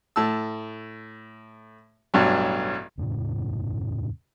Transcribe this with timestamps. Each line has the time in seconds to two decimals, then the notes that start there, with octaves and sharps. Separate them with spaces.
0.16 A2 A5 E6
2.14 A1 G2 B2 F#3
2.98 E1 F#2 A2 C#3